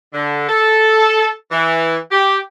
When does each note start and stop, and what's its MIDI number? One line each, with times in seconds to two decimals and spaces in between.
0.14 0.47 50
0.49 1.29 69
1.51 1.97 52
2.12 2.38 67